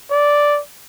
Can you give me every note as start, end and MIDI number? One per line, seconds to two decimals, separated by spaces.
0.11 0.60 74